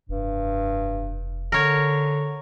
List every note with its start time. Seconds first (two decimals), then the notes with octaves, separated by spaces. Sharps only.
0.09 F1 G2
1.52 D3 A#4 C#5